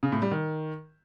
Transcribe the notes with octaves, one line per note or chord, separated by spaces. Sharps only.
C#3
A2
G3
D#3